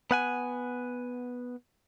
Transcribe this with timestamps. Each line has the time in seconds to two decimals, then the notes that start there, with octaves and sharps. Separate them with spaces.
0.11 B3 F#5 G#5